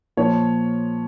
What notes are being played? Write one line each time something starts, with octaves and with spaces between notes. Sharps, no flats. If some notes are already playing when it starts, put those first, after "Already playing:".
A#2 F3 C#5